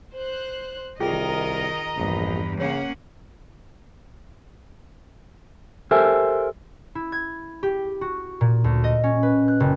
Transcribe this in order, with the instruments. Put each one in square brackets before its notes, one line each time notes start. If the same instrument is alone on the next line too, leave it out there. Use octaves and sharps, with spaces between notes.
[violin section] C5 F#6
[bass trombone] C2 [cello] D#3 A#4 [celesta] F4 G#4 G5 [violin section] D#5 A#5
[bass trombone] A#1 [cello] E2 G2
[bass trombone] C#3 [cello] A#3 C#4 [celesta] C#5 [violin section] F#5
[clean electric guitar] G4 A4 A#4 C5 E5 G#5
[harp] E4
G#6
G4
F#4
A#2
D2
D#5
C#4
B4
F#6
F#1